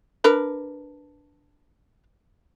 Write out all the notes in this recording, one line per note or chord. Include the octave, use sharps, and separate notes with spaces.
D4 A#4 B4